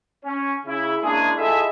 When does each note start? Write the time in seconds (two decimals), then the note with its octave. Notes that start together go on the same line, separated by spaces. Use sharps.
0.24 C#4
0.66 C#3 E4
1.02 G#3 A#3 C#4 D4 E4 G#4
1.38 E4 F4 G#4 A4 D#5 E5